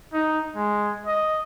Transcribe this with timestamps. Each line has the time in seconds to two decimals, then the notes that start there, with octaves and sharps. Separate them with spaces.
0.13 D#4
0.56 G#3
1.06 D#5